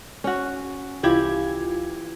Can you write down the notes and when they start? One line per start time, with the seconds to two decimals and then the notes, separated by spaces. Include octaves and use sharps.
0.24 C#4 F#4
1.03 C2 E3 E4 F4 G4 G#6